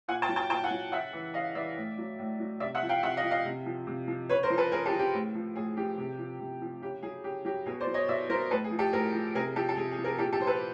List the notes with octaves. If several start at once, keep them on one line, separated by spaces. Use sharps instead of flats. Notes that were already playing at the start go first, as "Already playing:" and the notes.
A#2 F#5 G#5
G5 A5
F#3
G5 A5
A#2 G5 A5
F#5 G#5
F#3
C#3 E5 F#5
E3
C#3 D#5 F5
E3 D5 E5
A2
F#3
A2
F#3
C3 D5 E5
E5 F#5
F3
F5 G5
C3 E5 F#5
D#5 F5
F3
D#5 F5
C3
F3
C3
F3
C#3 B4 C#5
A#4 C5
F3
A4 B4
C#3 G#4 A#4
G4 A4
F3
G4
A2
F3
A2 G#4
F3 G4
C3
F3
C3
F3
C#3 G4
F#3 G#4
C#3 G4
F#3 G4
B2 G#4
C5 D5
F#3
C#5 D#5
B2 D5 E5
F#3 A#4 C5
A2 A4 B4
G#4
F3
G4 A4
A2 G#4 A#4
F3
C3 G#4 A#4
F3 G4 A4
A4
C3 G#4
G#4
F3
G#4 A#4
A#2 G4 A4
G4 A4
F3 C5
A4 B4